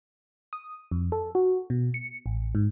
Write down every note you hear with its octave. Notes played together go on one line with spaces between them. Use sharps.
D#6
F2
A4
F#4
B2
C#7
A1
G#2